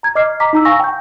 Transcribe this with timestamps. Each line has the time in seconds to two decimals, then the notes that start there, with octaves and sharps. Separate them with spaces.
0.03 A#5 G#6
0.15 D#5 D6 F6 C7
0.40 A#5 D6 B6
0.53 D#4 A#5 E6
0.65 F5 G#5 C#6 E6 A#6
0.80 G5 G6